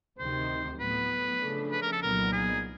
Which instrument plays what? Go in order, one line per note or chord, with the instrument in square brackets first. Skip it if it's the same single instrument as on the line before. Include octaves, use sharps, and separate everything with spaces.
[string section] D2 C3 D#3 [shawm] C5
[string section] A2 F#3 B3 [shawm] B4
[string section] C#3 F3 A3 D4
[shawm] B4
A#4
A4
[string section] C2 A#2 F#3 B3 D#4 [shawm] A#4
[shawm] G#4